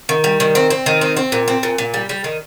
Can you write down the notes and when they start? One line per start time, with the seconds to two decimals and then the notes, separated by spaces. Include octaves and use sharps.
0.09 D#3
0.24 G3
0.40 D#3
0.55 C4
0.71 C4
0.86 D#3
1.01 C4
1.17 C4
1.32 A#2
1.48 C4
1.63 A#2
1.78 A#2
1.94 G3
2.09 G3
2.24 D#3